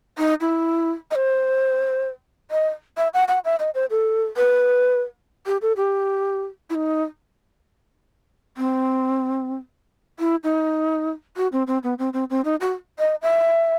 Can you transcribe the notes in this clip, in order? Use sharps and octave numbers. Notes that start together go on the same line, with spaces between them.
D#4
E4
D#5
C5
D#5
E5
F#5
F#5
E5
D#5
C5
A4
B4
G4
A4
G4
E4
D#4
C4
E4
D#4
F#4
C4
C4
B3
C4
C4
C4
D#4
F#4
D#5
E5